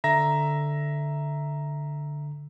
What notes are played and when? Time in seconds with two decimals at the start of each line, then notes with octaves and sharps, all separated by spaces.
0.04 D3 E5 A#5 A#6